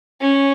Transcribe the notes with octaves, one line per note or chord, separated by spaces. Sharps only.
C#4